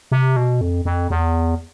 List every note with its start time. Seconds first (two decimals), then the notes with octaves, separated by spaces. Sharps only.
0.12 C3
0.36 B2
0.61 F2
0.85 F2
1.10 E2